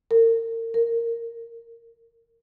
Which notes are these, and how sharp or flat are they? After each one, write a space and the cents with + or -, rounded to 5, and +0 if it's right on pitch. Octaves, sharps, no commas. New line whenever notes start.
A#4 -35
A#4 -10